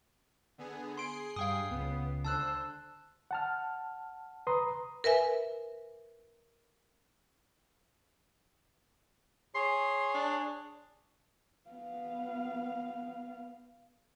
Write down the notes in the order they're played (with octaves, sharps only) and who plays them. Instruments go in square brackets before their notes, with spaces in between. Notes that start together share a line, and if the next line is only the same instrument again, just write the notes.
[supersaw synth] D3 B3 G#4
[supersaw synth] G#4 C7 [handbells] C6 D7
[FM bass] G2 [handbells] F5 G5 D#6
[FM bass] C#2 [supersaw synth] B3
[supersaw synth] D3 C5 [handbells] A5 E6 F#6
[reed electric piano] F#5 A5 F6
B4 A#5 C6 D#6
[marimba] A#4 B4 E5 G#5
[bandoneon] G#4 C#5 [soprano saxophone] C6
[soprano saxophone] D4
[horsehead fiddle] B3 F5